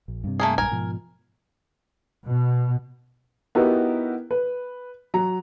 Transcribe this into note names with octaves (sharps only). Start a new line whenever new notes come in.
A#1
G2 C3
A3 A#3 G#4
A#1 G2 A#4 G#5
G#2 B2 F3
B2
B3 D#4 E4 F#4 G4 A#4
B4
F#3 A#5